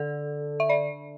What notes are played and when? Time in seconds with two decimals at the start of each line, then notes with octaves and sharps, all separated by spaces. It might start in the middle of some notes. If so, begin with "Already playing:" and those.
Already playing: D3 A4
0.60 E5
0.69 D5